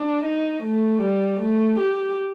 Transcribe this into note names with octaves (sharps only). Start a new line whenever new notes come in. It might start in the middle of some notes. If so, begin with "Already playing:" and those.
Already playing: D4
D#4
A3
G3
A3
G4